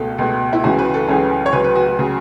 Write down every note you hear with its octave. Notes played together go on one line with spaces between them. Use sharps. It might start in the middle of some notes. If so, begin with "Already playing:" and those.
Already playing: C#2 B2 A3 A4
C#2 B2 A3
E4
C#2 C#3 E3 C#4 F#4
B4
A4
C#2 C#3 E3 C#4
C#5
C#2 C#3 F#3 B4
B4
F#4
F#4
C#3 F#3